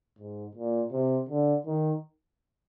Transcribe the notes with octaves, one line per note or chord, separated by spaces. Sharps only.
G#2
A#2
C3
D3
D#3